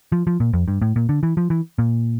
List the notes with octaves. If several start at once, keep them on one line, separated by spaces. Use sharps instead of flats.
F3
F3
A#2
F2
G2
A2
A#2
D3
E3
F3
E3
A#2